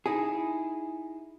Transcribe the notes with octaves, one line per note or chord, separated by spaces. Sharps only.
D#4 E4 G#4